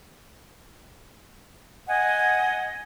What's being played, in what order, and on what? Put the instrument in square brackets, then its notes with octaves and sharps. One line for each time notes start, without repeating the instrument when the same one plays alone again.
[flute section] D#5 F#5 G#5